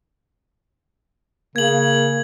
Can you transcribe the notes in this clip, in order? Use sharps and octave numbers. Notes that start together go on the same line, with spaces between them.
C#3 A#3 G#6 F#7